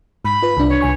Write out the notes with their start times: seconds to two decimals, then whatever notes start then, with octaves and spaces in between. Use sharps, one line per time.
0.25 G#2 B5
0.43 F4 B4
0.57 C2 D4
0.69 C#5
0.81 C2 G#5 C#6